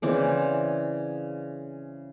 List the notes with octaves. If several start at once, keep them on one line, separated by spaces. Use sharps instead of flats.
C#3 E3 C4 D5